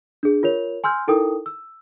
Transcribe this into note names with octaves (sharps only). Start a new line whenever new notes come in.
D4 G#4
F4 A#4 C#5 F7
G#5 C6 E6 F6 G6
D#4 E4 A4 A#4 G5 D#6
E6